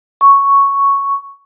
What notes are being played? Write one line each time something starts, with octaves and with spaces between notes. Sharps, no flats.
C#6